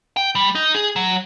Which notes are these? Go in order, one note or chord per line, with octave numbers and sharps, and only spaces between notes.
G5
G3
D#4
G#4
F#3